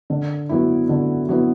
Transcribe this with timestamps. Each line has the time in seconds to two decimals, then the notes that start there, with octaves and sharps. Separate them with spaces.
0.10 D3
0.49 F#3 B3 E4
0.89 D3
1.29 F#3 B3 E4